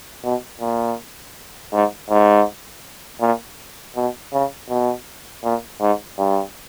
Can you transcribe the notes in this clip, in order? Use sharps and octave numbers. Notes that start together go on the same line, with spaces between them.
B2
A#2
G#2
G#2
A#2
B2
C#3
B2
A#2
G#2
G2